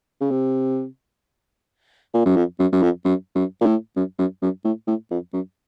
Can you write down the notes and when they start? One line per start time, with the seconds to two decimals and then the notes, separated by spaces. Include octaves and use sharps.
0.21 C#3
0.31 C3
2.14 A#2
2.26 F#2
2.36 F2
2.60 F#2
2.72 F#2
2.83 F2
3.05 F#2
3.35 F#2
3.61 A#2
3.66 A2
3.96 F#2
4.19 F#2
4.42 F#2
4.65 A2
4.87 A2
5.11 F2
5.33 F#2